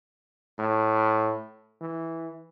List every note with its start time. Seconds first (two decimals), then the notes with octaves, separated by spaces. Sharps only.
0.59 A2
1.81 E3